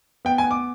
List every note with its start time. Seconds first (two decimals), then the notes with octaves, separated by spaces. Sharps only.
0.25 B3 G5
0.38 G#5
0.44 B3
0.51 D6